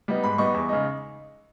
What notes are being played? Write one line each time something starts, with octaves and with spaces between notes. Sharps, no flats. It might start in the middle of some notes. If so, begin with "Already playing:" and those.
G3 B3 D#4
G#2 B5
G3 B3 D#4 C#6
E2
C#3 G#3 D#4